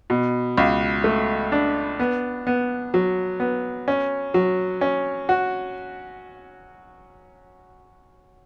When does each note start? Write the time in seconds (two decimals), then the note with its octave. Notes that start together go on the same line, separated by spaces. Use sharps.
0.10 B2
0.58 C#2
1.04 A3
1.52 D4
2.00 B3
2.47 B3
2.94 F#3
3.40 B3
3.88 C#4
4.34 F#3
4.81 C#4
5.29 F#4